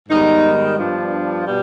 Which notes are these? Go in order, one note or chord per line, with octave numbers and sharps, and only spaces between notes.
G#2 D#3 G3 B3 D#4
G2 F3 B3 D4
B2 G3